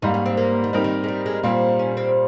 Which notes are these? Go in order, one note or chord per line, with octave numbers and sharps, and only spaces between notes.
G#2 G3 A#3 D#4
C#4
C4
A#3
D#3
F3 G3 C4 D#4 G4 A#4
D#3
G#3
G3
G#3
A#2 G3 A#3 C4
C#4
C4